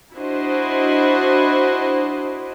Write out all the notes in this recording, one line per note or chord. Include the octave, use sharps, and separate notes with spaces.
D4 E4 F#4 C5 D#5